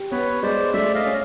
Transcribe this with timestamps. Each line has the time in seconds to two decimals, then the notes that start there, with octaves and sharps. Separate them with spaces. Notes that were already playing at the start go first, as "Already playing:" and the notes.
Already playing: G4
0.11 B3 B4 C#5
0.43 G#3 C5 D5
0.74 A3 D5 E5
0.94 D#5 F5
1.05 C#4